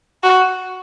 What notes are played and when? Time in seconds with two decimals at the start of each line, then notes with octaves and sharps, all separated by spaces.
0.23 F#4